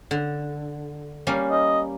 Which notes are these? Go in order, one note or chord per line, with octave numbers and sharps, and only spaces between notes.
D3
G3 A#3 C#4
D#5